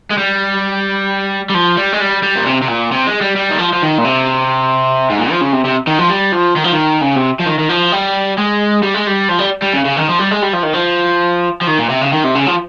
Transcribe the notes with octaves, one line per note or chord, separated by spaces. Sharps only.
G#3
G3
G3
F3
G3
G#3
G3
G3
A#2
C3
C3
A#2
C3
G#3
G3
G3
D#3
F3
F3
D#3
A#2
C3
G#2
A#2
F3
C#3
C3
C3
D#3
F3
G3
F3
D#3
F3
D#3
C#3
C3
F3
D#3
D#3
F3
G3
G#3
G3
G#3
G3
F3
G3
G3
C#3
C#3
D#3
F3
G3
G#3
G3
F3
D#3
F3
F3
D#3
A#2
C3
C#3
D#3
C3
C#3
F3